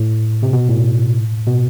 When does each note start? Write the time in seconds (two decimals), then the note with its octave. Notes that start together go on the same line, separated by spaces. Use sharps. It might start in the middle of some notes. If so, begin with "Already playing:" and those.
Already playing: A2
0.42 C3
0.53 B2
0.69 A2
1.47 B2